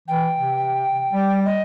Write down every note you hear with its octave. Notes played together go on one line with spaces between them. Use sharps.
E3 G5
C3
G3
D#5